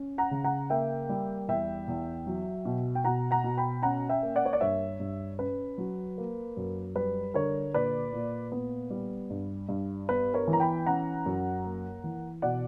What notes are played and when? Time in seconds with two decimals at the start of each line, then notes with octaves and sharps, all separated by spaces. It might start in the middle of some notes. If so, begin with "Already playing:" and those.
Already playing: C#4
0.18 F#5 A#5
0.31 C#3
0.44 F#5 A#5
0.70 A#3 E5 G5
1.09 G3
1.48 E2 E5 G5
1.88 E2
2.27 F#3
2.65 B2
2.95 G5
3.04 B2 F#5 A#5
3.31 F#5 A#5
3.44 B2
3.57 G5 B5
3.83 C#4 F#5 A#5
4.09 E5 G5
4.23 A#3
4.36 D5 F#5
4.45 C#5
4.53 D5
4.61 G2 C#5 E5
5.00 G2
5.39 C#4 B4
5.78 F#3
6.18 A#3
6.57 F#2
6.95 G3 B4
7.34 D3 A#4 C#5
7.74 A#2 B4 D5
8.13 A#2
8.52 B3
8.91 G3
9.30 G2
9.69 G2
10.09 B3 B4
10.34 A#4 C#5
10.47 E3
10.53 A#5
10.60 G5 B5
10.86 C#4 F#5 A#5
11.26 F#2
11.64 A#3
12.04 E3
12.42 B2 D5 F#5